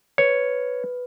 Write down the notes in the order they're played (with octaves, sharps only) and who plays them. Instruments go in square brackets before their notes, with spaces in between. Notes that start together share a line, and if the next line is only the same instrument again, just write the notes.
[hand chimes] B4 [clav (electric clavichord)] C#5